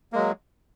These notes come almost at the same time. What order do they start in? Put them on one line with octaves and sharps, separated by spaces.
A#3 G#3 F#3